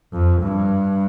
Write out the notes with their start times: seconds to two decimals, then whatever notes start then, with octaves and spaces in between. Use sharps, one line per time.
0.13 F2
0.42 G2